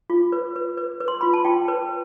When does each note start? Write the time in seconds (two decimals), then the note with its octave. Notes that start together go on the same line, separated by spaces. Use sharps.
0.10 F4
0.32 B4
0.56 B4
0.77 B4
1.00 B4
1.08 C6
1.21 F4 B5
1.34 A5
1.45 F4 G5
1.68 B4